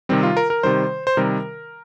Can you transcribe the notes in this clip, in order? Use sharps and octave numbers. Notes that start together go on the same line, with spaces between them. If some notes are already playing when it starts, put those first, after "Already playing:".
C3 D#3 G3 C4
F4
A#4
A#4
C3 D#3 G3 C5
C5
C3 D#3 G3 A#4